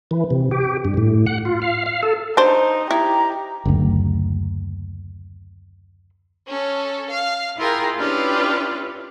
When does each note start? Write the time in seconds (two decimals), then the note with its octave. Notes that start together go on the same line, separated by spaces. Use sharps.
0.11 E3
0.30 C3
0.51 G4
0.85 G2
0.97 A2
1.27 F#5
1.45 F4
1.62 F5
1.86 F5
2.03 A4
2.37 D4 D#4 C5
2.91 E4 G4 A#5
3.65 F#1 D2
6.48 C#4 A4
7.10 F5
7.57 E4 F4 G#4 A#4 G5
7.98 C#4 D4 E4 F4 G4 B4